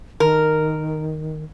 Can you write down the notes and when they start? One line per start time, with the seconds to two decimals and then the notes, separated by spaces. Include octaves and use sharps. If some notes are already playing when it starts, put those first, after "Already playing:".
0.20 D#3 A#4